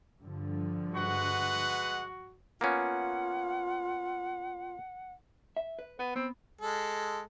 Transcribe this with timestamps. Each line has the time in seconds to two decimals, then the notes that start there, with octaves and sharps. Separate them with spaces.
0.21 G2 D3 F3
0.94 G#3 F#4 B4 F#5
2.61 A#3 B3 C#4 F4 F#5
5.57 E5
5.79 B4
5.99 B3 B4
6.16 B3 C4
6.61 G#3 A4